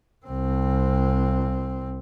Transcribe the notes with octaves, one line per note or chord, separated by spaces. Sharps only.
C2 C4